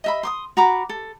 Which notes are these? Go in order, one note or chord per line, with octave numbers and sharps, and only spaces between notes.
D#5 E5 B5
C6 D6 D#6
F#4 A#5 B5 D6
A4